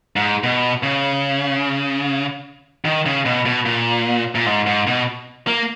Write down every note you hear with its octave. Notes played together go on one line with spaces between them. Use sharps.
G#2
B2
C#3
D#3
C#3
B2
B2
A#2
A#2
G#2
G#2
B2
A#3